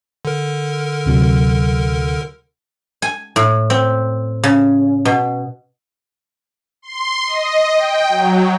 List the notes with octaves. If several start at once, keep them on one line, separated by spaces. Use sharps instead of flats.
D3 A#4
D2 C3 F#3
G#5
A2
C4
C#3
B2
C6
D#5
G5
F#3